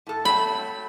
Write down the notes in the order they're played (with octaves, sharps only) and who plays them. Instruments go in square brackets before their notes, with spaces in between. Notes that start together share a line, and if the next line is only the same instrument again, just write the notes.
[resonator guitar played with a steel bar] A2 A4
[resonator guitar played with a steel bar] F#3 A3 C4 [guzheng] B5